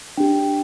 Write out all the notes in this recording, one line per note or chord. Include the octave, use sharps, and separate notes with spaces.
D4 G4 G5